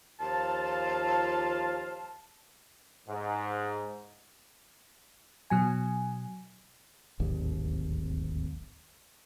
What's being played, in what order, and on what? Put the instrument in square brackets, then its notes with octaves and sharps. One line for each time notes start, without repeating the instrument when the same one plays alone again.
[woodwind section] D#2 F3 F4 A5
[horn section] G#2
[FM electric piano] B2 F#3 G#5
[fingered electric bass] D1 G#1 D#2